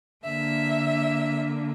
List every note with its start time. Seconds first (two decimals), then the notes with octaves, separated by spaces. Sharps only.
0.24 D3 A#3 E5